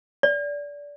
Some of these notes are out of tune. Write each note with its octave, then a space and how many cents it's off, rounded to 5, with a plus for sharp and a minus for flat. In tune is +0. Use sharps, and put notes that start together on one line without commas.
D5 -20